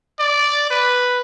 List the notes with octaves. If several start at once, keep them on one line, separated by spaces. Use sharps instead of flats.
D5
B4